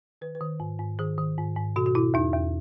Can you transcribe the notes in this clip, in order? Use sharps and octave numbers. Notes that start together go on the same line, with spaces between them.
D#3 B4
B4
D#3
G#2
G#2
D#3 G#4
D#3
G#2
G#2
B2 F#4
F#4
B2 E4
E2 D#4
E2